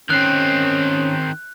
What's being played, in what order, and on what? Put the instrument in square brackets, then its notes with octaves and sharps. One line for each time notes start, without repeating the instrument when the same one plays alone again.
[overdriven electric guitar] D#3 C4 [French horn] C#4 [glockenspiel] F#6